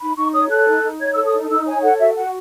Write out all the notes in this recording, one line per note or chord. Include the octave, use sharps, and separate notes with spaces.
D#4 B5
D#4 C#6
C#5 D#6
A4 F#6
D#4
D#4
C#5 G#6
A4 E6
D#6
D#4
D#4 E6
C#5 G#5
A4 F#5
F#4 E5
F#4 F#5